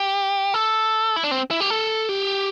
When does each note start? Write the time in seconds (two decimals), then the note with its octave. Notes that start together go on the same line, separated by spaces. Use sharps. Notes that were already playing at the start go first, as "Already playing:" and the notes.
Already playing: G4
0.54 A4
1.16 E4
1.24 D4
1.31 C4
1.51 E4
1.60 G4
1.70 A4
2.09 G4